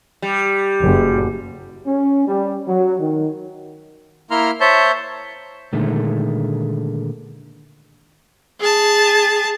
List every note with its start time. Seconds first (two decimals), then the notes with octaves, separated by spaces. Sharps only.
0.22 G3
0.82 F#1
1.86 C#4
2.28 G3
2.67 F#3
2.99 D#3
4.31 A#3 E4 A#5 C6 F6
4.61 C5 C#5 E5 A5 G6
5.73 A#2 D3 D#3 G#3 A3
8.60 G#4 A5